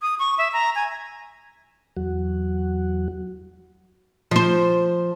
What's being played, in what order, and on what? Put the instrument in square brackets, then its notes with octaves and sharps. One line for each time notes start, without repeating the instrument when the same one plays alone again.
[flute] D#6
C#6
E5
A#5
G#5
[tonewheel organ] E2 F#3 F#4
[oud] F3 C5